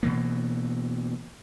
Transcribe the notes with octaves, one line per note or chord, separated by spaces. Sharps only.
B2 E3 A#3